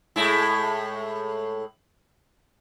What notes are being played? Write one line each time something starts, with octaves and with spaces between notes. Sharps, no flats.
A2 G#3 E4